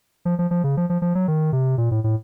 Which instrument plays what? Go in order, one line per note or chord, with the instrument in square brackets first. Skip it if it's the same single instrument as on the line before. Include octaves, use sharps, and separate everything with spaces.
[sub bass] F3
F3
F3
C#3
F3
F3
F3
F#3
D#3
C3
A#2
A2
A2